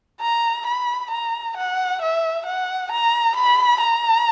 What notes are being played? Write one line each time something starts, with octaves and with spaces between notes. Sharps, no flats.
A#5
B5
A#5
F#5
E5
F#5
A#5
B5
A#5